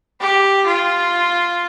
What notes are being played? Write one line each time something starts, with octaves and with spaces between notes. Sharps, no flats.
G4
F4